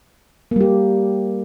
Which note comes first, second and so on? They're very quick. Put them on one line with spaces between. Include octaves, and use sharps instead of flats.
A#3 G3 G4